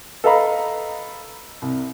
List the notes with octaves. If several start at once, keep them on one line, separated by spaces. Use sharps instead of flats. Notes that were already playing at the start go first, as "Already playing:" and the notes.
A4 B4 D#5 F5 A#5 B5
C2